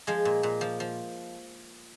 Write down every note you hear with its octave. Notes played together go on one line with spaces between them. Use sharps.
F3 G#3
A#2
A#2
F3
F3